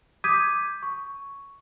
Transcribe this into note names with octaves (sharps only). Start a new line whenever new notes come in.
D6 D#6 G6 G#6 B6 D#7
C#6